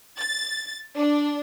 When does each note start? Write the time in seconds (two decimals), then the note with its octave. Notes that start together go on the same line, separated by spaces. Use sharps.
0.19 A6
0.98 D4